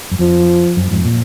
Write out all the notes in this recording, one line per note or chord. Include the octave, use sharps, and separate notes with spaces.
F#2
F2 F3
F#2
F2 G#2
A#2